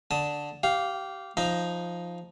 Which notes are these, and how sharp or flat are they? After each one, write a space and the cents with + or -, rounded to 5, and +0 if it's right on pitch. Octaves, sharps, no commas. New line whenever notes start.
D3 +0 A5 +0 D#6 +25
G4 -20 F5 +0
F3 +0 D#4 +5 A#5 +5